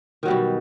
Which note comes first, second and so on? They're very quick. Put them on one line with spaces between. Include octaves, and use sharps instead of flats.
D#3 F#3 G3 B2